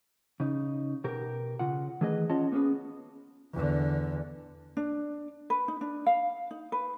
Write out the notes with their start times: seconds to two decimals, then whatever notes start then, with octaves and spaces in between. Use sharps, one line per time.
0.40 C#3 D#4
1.04 B2 G4 A#4
1.59 C#3 F4 F#5
2.01 D#3 E3 A3 G#4 B4 D#5
2.29 C#4 F4 C#5 D#5 F#5 A5
2.52 A#3 B3 C#4 F#4 G#4 B4
3.53 E2 D3
4.77 D4
5.50 B4
5.68 D#4
5.81 D4
6.06 F5
6.51 D#4
6.72 B4